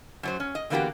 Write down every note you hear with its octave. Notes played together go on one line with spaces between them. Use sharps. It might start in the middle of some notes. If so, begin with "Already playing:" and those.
F#2 F#3 C5
C#4
D#5
D3 E3 A#3 B3 F#4 G4